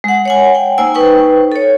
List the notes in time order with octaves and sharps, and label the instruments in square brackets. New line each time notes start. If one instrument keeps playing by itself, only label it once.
[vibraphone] G#3 F#5
C#5 F#5 G#5
G5
A#3 D#4 C5 G#5 E6
D#4 B4 C5 G5 C#6
A4 C#5